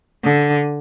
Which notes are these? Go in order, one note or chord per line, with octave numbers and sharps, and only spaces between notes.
D3